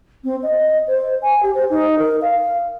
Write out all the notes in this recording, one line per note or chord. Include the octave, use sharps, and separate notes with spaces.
C4
D#5
C5
G#5
G4
C5
D#4
A#4
F5